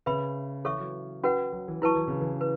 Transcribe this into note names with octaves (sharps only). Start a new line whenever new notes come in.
C#3 B4 E5 B5
E3 A4 C#5 E5 C#6
F#3
C#4 F#4 B4 F#5
F#3
E3
F#3 E4 B4 A5 C#6
E3
C#3
E3
B4